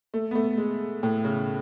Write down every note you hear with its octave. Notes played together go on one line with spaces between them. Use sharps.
A3
B3
A3
G#3
A2
C#3